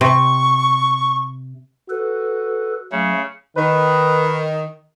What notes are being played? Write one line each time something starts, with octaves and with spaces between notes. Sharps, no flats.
C3 C#6
F#4 A4 B4
C#3 F#3 A3
D#3 B4